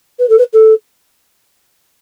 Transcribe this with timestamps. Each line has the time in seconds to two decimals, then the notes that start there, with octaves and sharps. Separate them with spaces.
0.19 B4
0.29 A4
0.38 B4
0.53 A4